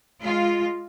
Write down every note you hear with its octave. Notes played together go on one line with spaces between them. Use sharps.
G#3 F4